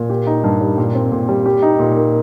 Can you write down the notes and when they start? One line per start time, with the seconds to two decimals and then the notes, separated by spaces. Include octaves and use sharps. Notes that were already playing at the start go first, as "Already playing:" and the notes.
Already playing: A#2
0.10 G4
0.27 D#4
0.44 G2
0.61 G3
0.78 A#2
0.95 C4
1.12 A#2
1.29 G3
1.46 G4
1.62 D#4
1.79 A#2
1.97 A#3